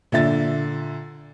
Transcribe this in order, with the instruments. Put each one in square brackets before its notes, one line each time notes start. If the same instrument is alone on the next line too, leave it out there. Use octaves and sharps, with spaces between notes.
[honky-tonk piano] A#2 D3 E5 A6